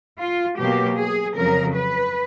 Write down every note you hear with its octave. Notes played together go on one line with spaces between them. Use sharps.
F4
B2 F#3 A#3 G4
G#4
F2 C#3 F#3 A#4
B4